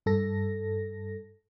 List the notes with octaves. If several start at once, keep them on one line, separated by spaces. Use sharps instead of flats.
G2 A4 A#6